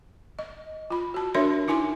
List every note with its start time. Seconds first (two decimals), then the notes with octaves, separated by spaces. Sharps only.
0.39 D#5
0.90 F4 B5
1.14 F#4 A5
1.35 D4 F#4 A#4 C#5 E5 C6
1.68 D#4 E4 G#5 C6 D6